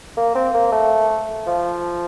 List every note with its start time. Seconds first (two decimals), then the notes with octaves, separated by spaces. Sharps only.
0.17 A#3
0.35 C4
0.54 A#3
0.72 A3
1.47 F3